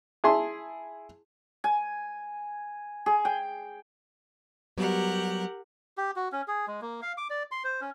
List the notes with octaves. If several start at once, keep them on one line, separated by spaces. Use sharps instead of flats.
E4 G#4 A5 C6
G#5
G#4
G5
F#3 G3 B3 G4 A#4 F#5
G4
F#4
C#4
G#4
G#3
A#3
F5
D6
D5
C6
C5
C#4